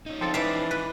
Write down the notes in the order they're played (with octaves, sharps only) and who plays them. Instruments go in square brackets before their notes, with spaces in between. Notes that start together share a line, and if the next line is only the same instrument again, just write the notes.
[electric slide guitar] C#4 D#4
[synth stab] F3 A4 [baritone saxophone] C4
[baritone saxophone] E3 [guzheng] D5 F5 [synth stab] E5
[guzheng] B4